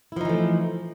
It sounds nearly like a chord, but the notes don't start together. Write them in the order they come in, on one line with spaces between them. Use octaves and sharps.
E4 F3 D#4 E3 A3